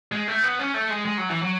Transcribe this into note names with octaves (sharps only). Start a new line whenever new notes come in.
G#3
A3
B3
C#4
A3
G#3
G#3
F#3
E3
F#3